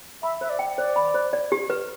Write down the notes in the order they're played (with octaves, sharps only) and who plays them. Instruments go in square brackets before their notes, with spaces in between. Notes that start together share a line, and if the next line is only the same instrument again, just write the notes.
[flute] E5 [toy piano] B5
[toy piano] C5 [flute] E5
[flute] D5
[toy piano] G5
[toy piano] C5 [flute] D5
[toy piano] B5
C5
D5
G4
B4